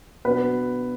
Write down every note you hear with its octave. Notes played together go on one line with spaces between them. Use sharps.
B2 F#3 B3 D4 B4